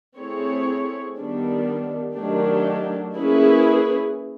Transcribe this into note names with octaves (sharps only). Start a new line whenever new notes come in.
A3 C4 E4 G#4 C#5
D#3 G3 B3 D4
D#3 F#3 A3 D4 G4
A#3 C#4 E4 G#4 B4